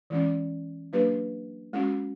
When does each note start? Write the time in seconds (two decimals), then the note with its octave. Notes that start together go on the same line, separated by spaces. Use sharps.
0.10 E3 G#3 C#4
0.93 F#3 A#3 D4 G4 B4
1.73 G#3 C#4 F#4